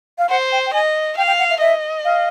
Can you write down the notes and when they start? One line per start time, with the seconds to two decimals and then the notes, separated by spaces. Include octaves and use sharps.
0.18 F5
0.29 C5 F#5
0.52 G5
0.66 G5
0.73 D#5 G#5
1.17 F5 G5
1.27 G5
1.39 F#5
1.50 E5
1.60 D#5 E5
2.05 F5